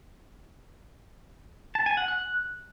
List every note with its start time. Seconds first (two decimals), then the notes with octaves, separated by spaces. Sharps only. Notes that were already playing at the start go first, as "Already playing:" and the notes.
1.75 A5
1.86 G#5
1.97 F#5
2.08 F#6